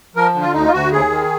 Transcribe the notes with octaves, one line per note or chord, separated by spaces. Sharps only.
F3 A#4
D3
F4
D2 D#4
F4
D2 F#4
D#2 G#4
D#3